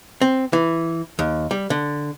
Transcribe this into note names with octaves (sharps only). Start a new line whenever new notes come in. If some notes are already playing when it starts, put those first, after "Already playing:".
C4
E3
D#2
G3
D3